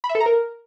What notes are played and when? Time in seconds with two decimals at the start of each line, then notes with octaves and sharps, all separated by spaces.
0.04 B5
0.09 E5
0.15 A4
0.20 A#5
0.26 A#4